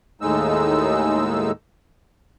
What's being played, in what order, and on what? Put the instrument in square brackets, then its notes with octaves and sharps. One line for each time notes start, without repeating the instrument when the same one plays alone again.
[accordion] D#2 A2 G#3 D#4 E6